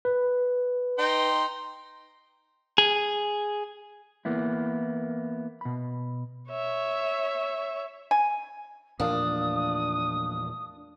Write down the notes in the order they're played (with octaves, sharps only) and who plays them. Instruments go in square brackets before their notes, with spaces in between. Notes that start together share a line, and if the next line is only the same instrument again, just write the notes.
[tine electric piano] B4
[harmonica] D#4 G5 C6
[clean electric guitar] G#4
E3 A#3 B3 E4
B2 B5
[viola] C#5 E5
[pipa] G#5
[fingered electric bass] E2 A#2 F3 [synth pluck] A3 A#4 F5 [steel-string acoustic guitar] D4 [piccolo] D#6